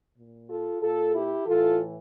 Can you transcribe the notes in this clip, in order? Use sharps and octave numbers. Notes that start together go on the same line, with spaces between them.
A#2
F4 A4
A#2 F4 A4
E4 G4
A2 E3 F4 A4